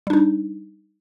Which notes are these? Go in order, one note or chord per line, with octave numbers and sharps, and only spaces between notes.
G3 D4 D#4